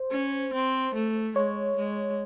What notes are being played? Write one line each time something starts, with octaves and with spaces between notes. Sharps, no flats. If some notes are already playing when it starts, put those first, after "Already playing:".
Already playing: C5
C#4
C4
A3
G#3 C#5
G#3